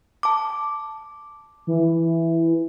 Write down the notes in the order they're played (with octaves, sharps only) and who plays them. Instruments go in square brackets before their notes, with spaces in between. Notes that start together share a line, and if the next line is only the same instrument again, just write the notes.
[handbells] A5 D6
[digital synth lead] E3